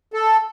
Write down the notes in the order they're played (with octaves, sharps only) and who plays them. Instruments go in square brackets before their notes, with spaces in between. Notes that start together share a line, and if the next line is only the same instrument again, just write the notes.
[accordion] A4